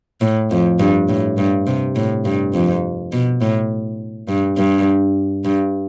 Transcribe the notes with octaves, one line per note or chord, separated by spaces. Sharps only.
A2
F2
G2
A2
G2
C3
A2
G2
F2
B2
A2
G2
G2
G2